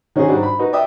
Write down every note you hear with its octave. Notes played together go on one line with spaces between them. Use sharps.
D#3 C#4 F#4 G#4 C5
G#2 F#3 G3 D4 F#4
B5
D#4 F#4 B4
D5 E5 G5 D#6